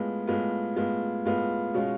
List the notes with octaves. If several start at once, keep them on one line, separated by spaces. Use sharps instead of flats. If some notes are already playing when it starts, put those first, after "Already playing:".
Already playing: A2 G#3 B3 F4
A2 G#3 B3 F4
A2 G#3 B3 F4
A2 G#3 B3 F4
B2 G#3 C#4 F4